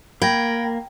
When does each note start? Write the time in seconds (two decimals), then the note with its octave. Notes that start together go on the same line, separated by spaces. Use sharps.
0.22 A#3 G5 B5 G#6 A#6